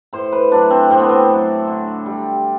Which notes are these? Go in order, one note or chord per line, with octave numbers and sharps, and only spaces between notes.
A2 C5
B4
F#3 A3 D4
C4
A2 C4
B3
C4
F#3 A3
D3
G3